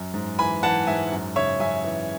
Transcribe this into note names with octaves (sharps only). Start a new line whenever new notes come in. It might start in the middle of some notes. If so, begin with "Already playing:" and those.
Already playing: F#2
G#2
E3 G#5 B5
E3 F#5 A5
G#2 E5 G#5
F#2
C#3 C#5 E5
F#2 E5 G#5
E3